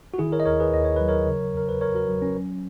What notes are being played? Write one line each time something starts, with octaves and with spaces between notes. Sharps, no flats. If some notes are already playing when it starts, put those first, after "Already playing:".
F#4
D#3 E4 G#4
A#4 C#5
D#5
D#2 A#4 C#5
G#4 B4
D#2 D#5
C#5
F#3 B4
A#4 C#5
C#3
E2 A#4
B4
E2 A#4 C#5
F#4 A#4
F#3
C#4
F#3